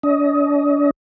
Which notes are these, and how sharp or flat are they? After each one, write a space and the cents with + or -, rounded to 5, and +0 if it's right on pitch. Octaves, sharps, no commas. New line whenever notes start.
D4 -40 D#5 +20